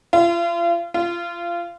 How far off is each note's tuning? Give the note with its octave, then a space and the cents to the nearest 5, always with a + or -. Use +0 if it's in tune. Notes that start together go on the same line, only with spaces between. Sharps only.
F4 -35
F4 -20